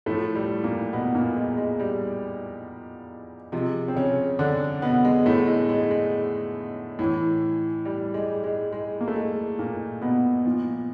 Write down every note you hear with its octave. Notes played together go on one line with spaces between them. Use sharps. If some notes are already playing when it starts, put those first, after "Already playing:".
A2 F3 A3
G3
A#2 A#3
B2 B3
A#2 A#3
G#3
G#3
G3
C3 F3 G#3
C4
C#3 C#4
D3 D4
B2 B3
G#3
A2 A3
G#3
G#3
G#3
A2 E3
G3
G#3
G#3
G#3
A#3
A3
G#3
A#2 A#3
B2 B3
A#2 F3